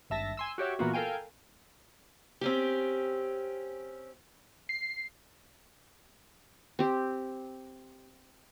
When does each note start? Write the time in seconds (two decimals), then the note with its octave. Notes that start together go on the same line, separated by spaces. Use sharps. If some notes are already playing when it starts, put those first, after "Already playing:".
0.10 G#1 G2 E5 A5 A#6
0.37 G#5 C6 E6
0.58 F#4 G4 C#5 E5
0.79 A#2 E3 A#3 B3 F4 F#4
0.93 A4 A#4 F5 G5 G#5
2.41 C4 C#4 G4
4.69 C7
6.79 C4 G4